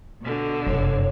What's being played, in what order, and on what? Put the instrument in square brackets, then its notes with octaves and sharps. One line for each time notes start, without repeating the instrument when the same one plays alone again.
[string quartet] B2 D3
[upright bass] F1 F#2 [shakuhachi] C#5